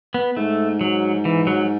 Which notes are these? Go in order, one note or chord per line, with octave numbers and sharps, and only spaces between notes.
B3
G#2 A3
F#3
E3
F#3